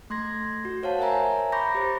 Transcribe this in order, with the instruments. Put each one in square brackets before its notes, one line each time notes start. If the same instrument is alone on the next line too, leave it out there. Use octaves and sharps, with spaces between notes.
[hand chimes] A3 C6 G#6 A#6
F#4
C5 C#5 F5 F#5 A5
A#4 C5 C#5 E5 G#5 A#5
A#5 B5 C#6 D6 G6 A#6
G4 C5